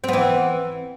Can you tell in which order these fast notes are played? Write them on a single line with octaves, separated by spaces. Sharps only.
C4 B3 E3